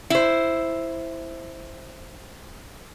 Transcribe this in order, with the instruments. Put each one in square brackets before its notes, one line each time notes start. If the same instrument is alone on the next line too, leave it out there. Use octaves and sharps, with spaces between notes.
[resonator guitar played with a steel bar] E4 C5